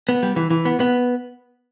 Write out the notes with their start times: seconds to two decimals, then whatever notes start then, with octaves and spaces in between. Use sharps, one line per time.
0.09 B3
0.23 G3
0.36 E3
0.50 E3
0.65 B3
0.80 B3